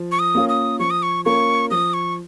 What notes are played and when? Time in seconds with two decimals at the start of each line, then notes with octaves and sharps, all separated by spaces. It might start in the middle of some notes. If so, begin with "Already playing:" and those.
Already playing: F3
0.12 C#6
0.19 D#6
0.35 A#3 C#4 F4 A#4
0.49 D#6
0.79 F3 C#6
0.91 D#6
1.03 C#6
1.25 A#3 C#4 F4 A#4 C#6
1.71 F3 D#6
1.94 C#6